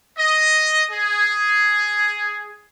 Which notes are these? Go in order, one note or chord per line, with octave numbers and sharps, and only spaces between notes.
D#5
G#4